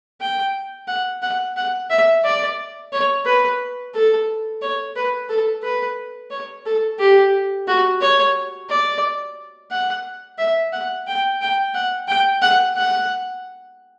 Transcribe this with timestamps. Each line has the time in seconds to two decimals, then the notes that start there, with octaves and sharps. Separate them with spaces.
0.21 G5
0.88 F#5
1.22 F#5
1.57 F#5
1.90 E5
2.24 D5
2.92 C#5
3.25 B4
3.95 A4
4.62 C#5
4.96 B4
5.29 A4
5.63 B4
6.31 C#5
6.66 A4
6.99 G4
7.68 F#4
8.01 C#5
8.69 D5
9.72 F#5
10.39 E5
10.73 F#5
11.07 G5
11.41 G5
11.74 F#5
12.08 G5
12.42 F#5
12.77 F#5